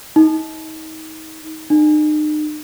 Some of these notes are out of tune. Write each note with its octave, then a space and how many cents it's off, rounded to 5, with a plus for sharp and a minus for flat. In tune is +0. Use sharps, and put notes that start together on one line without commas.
D#4 +30
D#4 -40